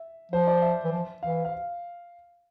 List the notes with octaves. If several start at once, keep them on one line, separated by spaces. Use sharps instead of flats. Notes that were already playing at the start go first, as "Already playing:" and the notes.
Already playing: E5
F3 C5
D5
E5
E3
F3
E3 F5
F5